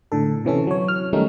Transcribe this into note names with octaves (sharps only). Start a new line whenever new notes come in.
A2 D3 A4
C3 E3 C#4 A4
F#3 C#5
F6
D#3 F#3 G3 A3 C#4 D#4